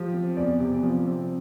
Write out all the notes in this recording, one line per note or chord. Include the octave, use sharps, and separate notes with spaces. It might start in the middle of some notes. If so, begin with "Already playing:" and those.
Already playing: F3 G4
C4
E2 D5
C3
F3
C4